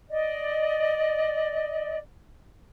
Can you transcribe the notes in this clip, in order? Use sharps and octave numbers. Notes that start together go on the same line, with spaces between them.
D5 D#5